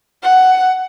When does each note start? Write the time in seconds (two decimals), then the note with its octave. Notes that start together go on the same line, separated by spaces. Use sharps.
0.23 F#5